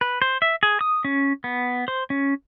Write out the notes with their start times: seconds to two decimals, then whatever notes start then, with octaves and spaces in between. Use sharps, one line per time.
0.01 B4
0.22 C5
0.42 E5
0.63 G#4
0.81 D#6
1.05 C#4
1.44 B3
1.88 C5
2.10 C#4